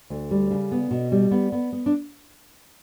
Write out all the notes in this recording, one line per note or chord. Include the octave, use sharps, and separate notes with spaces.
D2
G3
C#3
B3
B2
G3
B3
B3
B3
D4